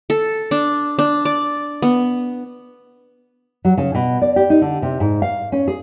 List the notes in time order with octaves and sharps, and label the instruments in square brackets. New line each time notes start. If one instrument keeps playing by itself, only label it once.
[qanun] A4
D4
D4
D5
B3
[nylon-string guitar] F#3
C#3
B2
D5
G4
D#4
D3
C3
G#2
F5
C#4
G#4